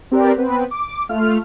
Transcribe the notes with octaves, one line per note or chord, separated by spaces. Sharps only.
C4 G4 A#4 B4 D5
B3 C4 B4
D6
A3 F4 F6